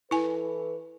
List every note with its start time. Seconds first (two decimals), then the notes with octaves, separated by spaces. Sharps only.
0.11 E3 E4 A4 B4 G#5